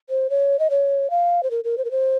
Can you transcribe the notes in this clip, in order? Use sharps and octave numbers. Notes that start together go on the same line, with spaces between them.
C5
C#5
D#5
C#5
F5
C5
A#4
A#4
C5
A#4
C5